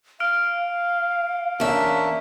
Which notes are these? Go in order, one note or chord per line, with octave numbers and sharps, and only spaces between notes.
F5 F6 D7 F7
E2 A#3 C#4 D4 E5